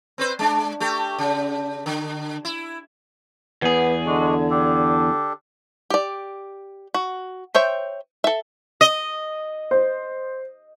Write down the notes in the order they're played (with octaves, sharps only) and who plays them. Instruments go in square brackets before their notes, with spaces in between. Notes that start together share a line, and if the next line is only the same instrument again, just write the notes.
[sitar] C4 B4 C5
G#3 D4
A3 G4
C#3
D3
E4
[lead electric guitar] E2 G#4 [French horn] B3
[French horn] D3 [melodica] G#3 D4 F#4
[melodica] D4 G4 A4
[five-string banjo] G4 D5
F#4
C5 C#5 E5 G5
A4 E5
[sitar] D#5
[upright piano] C5